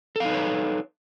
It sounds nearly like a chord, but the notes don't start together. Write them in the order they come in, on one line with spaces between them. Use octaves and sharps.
A4 F5 D#4 B4 C#5